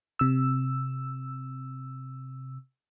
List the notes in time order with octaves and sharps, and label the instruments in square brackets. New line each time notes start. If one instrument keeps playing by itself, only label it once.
[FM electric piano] C3 E6